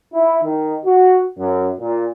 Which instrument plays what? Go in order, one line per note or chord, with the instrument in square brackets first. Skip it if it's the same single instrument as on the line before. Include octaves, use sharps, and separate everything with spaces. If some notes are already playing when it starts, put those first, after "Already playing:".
[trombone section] E4
D#3
F#4
F#2
A#2